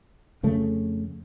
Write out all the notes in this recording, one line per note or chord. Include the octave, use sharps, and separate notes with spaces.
F2 C#3 A3